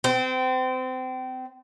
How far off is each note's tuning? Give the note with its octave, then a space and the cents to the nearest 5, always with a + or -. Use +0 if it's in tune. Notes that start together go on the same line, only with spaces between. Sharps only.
C4 -30